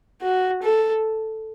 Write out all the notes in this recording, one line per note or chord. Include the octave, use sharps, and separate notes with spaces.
F#4
A4